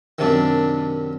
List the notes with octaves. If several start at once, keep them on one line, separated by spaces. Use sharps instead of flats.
F#2 C3 D#3 D4